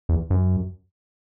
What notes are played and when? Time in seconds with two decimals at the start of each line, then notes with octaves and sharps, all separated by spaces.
0.09 E2
0.30 F#2